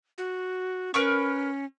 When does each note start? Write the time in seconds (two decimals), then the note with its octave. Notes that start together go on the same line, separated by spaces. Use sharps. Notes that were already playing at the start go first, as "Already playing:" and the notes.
0.18 F#4
0.94 C#4 A#4 B4 C#6